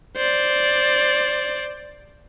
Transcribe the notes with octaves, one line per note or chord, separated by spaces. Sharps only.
C5 D5